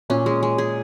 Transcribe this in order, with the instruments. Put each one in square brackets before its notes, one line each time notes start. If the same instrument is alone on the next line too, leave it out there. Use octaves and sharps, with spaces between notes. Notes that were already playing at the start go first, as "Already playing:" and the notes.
[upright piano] A#2 [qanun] C#4
[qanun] G#3
G#3
G#4